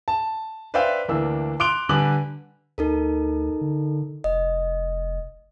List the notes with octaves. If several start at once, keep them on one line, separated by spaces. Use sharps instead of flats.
A5
B4 C5 D5 E5 F5 G5
D2 E3 A#3 D4 E6
C6 D6 F#6 D7 F7 G7
D3 G3 B4 G#5 D6 F#7
D2 D#4 A4 A#4
D3
F1 D#5